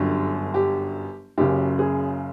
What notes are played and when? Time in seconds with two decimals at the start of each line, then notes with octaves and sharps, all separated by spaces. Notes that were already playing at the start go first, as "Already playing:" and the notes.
Already playing: G1 F#2 D3 G4
0.54 G4
1.38 F#1 F#2 C#3 G4
1.79 G#4